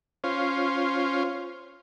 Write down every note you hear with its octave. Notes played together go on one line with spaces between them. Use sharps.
C#4 F4 C5